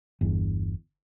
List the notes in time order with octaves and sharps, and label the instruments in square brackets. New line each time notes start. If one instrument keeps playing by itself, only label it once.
[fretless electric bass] G1 E2